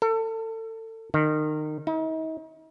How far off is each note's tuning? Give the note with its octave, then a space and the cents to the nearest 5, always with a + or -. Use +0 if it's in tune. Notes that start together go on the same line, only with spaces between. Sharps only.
A4 +30
D#3 -25
D#4 +45